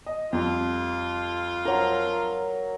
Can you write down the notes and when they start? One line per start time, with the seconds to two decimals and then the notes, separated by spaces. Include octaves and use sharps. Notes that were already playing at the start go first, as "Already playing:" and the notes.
0.06 D#5
0.33 F2 G3 F4
1.65 F#3 A#4